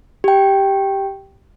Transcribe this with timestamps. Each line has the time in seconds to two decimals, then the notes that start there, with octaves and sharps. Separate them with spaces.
0.24 G4 G5